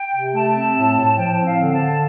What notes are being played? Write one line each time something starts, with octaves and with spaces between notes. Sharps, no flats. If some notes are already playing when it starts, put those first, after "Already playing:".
Already playing: G5
C3
A3 A5
C4
A2
A2
F3 G5
C4
F5
D3
A5
D3